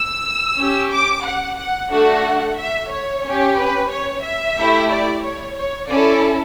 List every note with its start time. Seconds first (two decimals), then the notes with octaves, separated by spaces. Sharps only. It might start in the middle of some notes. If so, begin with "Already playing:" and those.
Already playing: E6
0.58 C#4 G4
0.91 D6
1.24 F#5
1.58 F#5
1.91 A3 D4 F#4 A4 F#5
2.58 E5
2.91 C#5
3.24 C#4 G4
3.57 B4
3.90 C#5
4.23 E5
4.57 A3 E4 G4
4.90 D5
5.23 C#5
5.57 C#5
5.89 C#4 E4 A4 D5